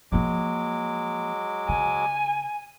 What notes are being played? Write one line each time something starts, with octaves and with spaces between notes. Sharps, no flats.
F3 F#3 G#3 A#3 D6
C#3 G#5